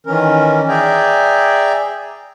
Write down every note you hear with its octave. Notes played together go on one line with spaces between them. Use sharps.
D#3 E3 C#4 A#4
G#4 D5 E5 G5 G#5 A#5